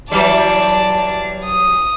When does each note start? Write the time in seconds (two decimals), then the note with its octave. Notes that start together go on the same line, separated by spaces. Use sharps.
0.12 E3 F#3 G3 D5 A5
1.45 D#6